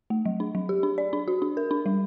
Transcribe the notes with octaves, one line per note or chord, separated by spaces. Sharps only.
A3
F#3
D4
F#3
G4
D4
D5
D4
F#4
D4
A#4
D4
G3